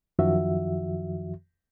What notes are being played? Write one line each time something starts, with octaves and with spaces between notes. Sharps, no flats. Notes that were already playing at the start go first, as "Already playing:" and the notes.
F#2 D#3 F3 F#4 E5